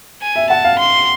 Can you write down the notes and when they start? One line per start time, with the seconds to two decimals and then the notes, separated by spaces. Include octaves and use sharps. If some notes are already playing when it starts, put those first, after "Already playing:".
0.22 G#5
0.36 E5
0.50 F#5 A5
0.65 F5
0.79 C6